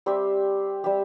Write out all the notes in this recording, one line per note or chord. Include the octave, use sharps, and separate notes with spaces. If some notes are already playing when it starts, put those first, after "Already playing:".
G3 C4 G4 E5
G3 C4 G4 E5